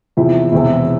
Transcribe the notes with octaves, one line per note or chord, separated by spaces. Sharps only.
E2 C3 F3 E4
E1 E2 C3 E3 E4